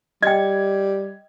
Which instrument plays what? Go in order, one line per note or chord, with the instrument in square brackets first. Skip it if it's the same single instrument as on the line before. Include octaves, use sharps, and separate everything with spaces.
[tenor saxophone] G3 [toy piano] D#5 G5 [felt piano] G#6